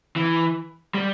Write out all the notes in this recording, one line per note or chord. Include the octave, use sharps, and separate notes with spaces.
E3
G3